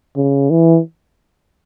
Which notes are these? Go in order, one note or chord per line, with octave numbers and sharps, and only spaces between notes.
C#3
E3